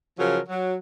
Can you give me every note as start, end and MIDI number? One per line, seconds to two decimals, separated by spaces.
0.19 0.38 49
0.19 0.38 53
0.19 0.38 54
0.19 0.38 70
0.49 0.76 54